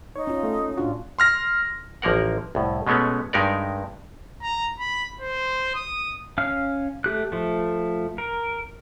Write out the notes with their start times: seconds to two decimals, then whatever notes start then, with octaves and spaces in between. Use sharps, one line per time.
0.16 D#4 C#5
0.27 C#4 F4
0.43 A3
0.77 A2 D4 F4 F#4
1.19 C6 F6 A#6
2.02 A1 F3 A#3 A#4 F#5
2.55 C2 A2
2.87 B2 G#3 A3 B3 C#4
3.33 G2 G#3 D#4 G4 A#4 D5
4.42 A#5
4.79 B5
5.21 C5
5.75 D#6
6.38 C#4 F5 F6
7.04 A3 G4 F#6
7.32 F3 A3
8.18 A#4